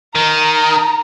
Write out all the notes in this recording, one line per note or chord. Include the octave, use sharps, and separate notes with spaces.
D#3 A#5